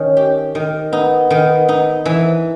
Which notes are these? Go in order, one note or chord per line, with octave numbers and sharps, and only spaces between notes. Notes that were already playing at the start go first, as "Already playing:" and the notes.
Already playing: D#3 C#4
G4
D#3
B3 D#4
D#3
D#4
E3